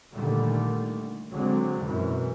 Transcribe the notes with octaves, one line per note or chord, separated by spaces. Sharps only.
A#2 D3 D#3 G3 A3
D3 F#3 G#3 C4
F#2 B2 E3